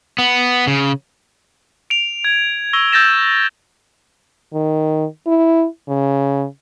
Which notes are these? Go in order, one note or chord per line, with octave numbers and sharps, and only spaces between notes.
B3
C#3
D7 F7
G#6
C#6 E6 A#6 G7
E6 G6 A6 A#6 E7
D#3
E4
C#3